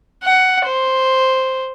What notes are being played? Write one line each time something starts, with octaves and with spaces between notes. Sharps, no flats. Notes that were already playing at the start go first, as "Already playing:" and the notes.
F#5
C5